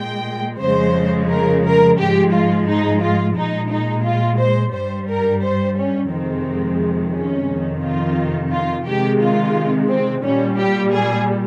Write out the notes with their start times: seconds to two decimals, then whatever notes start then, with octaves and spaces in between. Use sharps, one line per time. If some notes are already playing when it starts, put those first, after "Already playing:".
Already playing: A#2 G#3 G5
0.60 F2 C#3 F3 G#3 C5
1.30 A#4
1.64 A#4
1.98 G#2 F3 G#3 G4
2.33 F4
2.67 D#4
3.01 F4
3.36 A#2 G#3 D#4
3.70 D#4
4.05 F4
4.39 C5
4.73 G2 G3 C5
5.08 A#4
5.42 C5
5.77 C#4
6.11 F2 C3 D#3 G#3 C4
7.14 C#4
7.49 F2 C3 D#3
7.83 F4
8.52 F4
8.87 C3 D#3 G#3 G4
9.21 F4
9.90 C4
10.24 A#2 G3 C#4
10.58 G4
10.93 G#4